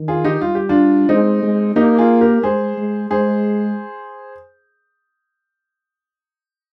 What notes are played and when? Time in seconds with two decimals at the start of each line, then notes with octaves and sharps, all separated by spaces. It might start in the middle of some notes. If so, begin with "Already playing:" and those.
Already playing: D#3
0.08 F4 G#4
0.24 D#4 G4
0.41 G3 F4
0.55 G4
0.69 D4 F4
1.09 G#3 C4 D#4
1.43 G#3
1.76 A#3 D#4 G4
1.98 F4 G#4
2.21 G4 A#4
2.43 G#3 G#4 C5
2.77 G#3
3.11 G#3 G#4 C5